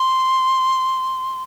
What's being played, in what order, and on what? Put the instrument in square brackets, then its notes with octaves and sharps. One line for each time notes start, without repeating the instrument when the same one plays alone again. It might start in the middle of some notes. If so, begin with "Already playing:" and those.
Already playing: [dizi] C6